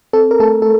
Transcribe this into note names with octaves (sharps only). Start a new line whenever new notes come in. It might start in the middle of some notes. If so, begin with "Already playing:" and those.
C4 A4
A#4
A3 A4
A4